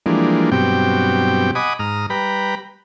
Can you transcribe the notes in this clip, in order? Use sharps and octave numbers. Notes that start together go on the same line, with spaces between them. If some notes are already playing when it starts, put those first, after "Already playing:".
E3 F3 G3 G#3 A#3 D4
G2 B2 F#3 C4 G4 G5
D#5 F#5 G#5 B5 D6 D#6
G#2 A#5 D#6 F6
G3 B4 G5 A#5 B5